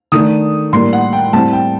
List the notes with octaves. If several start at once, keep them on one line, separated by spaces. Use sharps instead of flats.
D#3 A3 D4 D#6
A2 G3 A#3 D4 C6
F#5
G5
A2 G3 C4 A5
G5